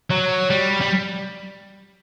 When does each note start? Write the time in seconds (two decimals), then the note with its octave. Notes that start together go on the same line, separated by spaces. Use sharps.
0.10 F#3
0.50 G3
0.81 G3